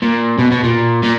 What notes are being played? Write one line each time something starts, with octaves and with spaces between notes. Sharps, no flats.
A#2
B2
B2
A#2
A#2